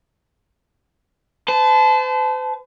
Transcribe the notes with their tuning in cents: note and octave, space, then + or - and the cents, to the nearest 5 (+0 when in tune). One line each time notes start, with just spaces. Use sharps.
C5 -45 A5 -20